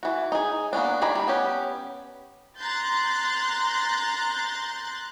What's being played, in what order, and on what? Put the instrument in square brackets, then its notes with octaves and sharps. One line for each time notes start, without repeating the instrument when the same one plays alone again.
[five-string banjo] E3 F#4
D#4 G#4
A#3 B3 C#4 D4
D#3 G#4 D5 A#5 B5
G3
B3 C#4 G4
[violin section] A#5 C6 F#6 G6 A6